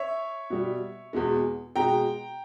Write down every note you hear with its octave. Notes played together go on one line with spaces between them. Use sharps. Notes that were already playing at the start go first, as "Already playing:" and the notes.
Already playing: C#5 E5
B2 G3
E2 B2 G#3
B2 G#3 G5 A#5